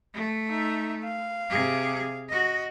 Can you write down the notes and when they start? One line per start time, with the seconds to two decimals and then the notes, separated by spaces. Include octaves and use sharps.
0.14 A3
0.48 D#4 E5
1.04 F5
1.49 C3 G#4
2.29 F#4 D#5